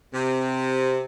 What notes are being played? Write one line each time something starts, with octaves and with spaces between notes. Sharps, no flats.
C3